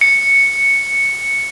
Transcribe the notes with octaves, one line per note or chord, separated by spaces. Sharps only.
C#7